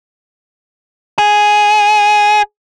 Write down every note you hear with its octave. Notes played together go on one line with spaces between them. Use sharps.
G#4